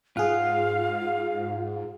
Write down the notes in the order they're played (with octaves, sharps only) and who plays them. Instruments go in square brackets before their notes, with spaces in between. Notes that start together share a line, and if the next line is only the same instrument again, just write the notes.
[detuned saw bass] G#2 [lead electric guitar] F4 [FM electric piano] G#4 F#5 [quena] F5